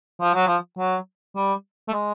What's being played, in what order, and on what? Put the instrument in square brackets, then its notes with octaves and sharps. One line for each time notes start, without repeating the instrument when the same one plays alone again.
[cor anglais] F3
F#3
F3
F#3
G3
A3
G#3